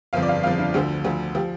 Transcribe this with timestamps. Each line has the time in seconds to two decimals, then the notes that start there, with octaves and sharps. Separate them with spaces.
0.13 G1 F2 F3 F5
0.23 D5
0.29 F5
0.43 G1 F2 F3 F5
0.59 D4
0.74 D2 D3 F3
1.04 D2 D3 F3
1.35 F3 G4